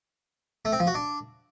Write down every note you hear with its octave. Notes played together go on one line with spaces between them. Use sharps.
A3
C4
F3
F#4
D4